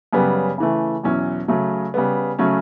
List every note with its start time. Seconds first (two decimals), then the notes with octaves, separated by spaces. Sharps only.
0.13 F#2 C#3 G3 B3
0.58 C#3 E3 A3
1.03 E2 B2 F#3 C#4 E4
1.48 C#3 F#3 A3
1.94 C#3 G3 B3
2.39 C#3 F#3 A3 C#4